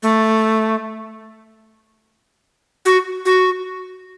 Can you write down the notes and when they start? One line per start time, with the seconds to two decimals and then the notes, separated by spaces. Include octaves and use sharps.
0.02 A3
2.85 F#4
3.25 F#4